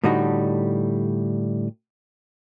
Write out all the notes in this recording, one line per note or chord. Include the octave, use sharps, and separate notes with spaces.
A2 D3 G3 D#4 F#4 D#5